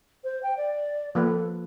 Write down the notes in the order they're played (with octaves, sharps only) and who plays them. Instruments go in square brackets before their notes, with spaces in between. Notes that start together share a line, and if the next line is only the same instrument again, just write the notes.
[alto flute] C5
G5
D5
[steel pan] F3 A#3 B4 [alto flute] A4